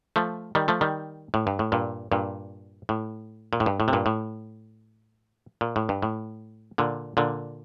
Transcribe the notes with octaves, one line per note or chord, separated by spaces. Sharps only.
F3 A3
D#3 G3
F3 A3
D#3 G3
A2
G2
A2
G2 A#2
G2 A#2
A2
A#2
A2
G2
A2
C3
G2 A#2
A2
A#2
A2
G2
A2
A#2 D3
A#2 D3